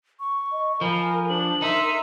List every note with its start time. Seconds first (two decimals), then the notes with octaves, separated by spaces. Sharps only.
0.20 C#6
0.52 D#5
0.81 F3 A#4 G#5 B5
1.29 D4 C5 F#7
1.62 D#4 A#4 E5 C6